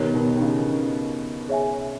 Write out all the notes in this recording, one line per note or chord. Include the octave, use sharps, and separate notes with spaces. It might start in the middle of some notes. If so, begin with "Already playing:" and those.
Already playing: B2 D#3 G4 A#4 C#5
B2 D#3
D#3
C#3
G#4 C#5 E5 G#5